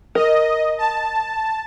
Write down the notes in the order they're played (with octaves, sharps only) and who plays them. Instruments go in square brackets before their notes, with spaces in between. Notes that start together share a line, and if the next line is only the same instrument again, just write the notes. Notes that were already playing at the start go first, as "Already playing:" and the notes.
[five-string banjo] A#4 [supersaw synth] D#5
[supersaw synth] A5